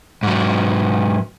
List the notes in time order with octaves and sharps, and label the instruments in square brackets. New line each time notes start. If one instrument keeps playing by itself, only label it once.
[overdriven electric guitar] G#2 F#3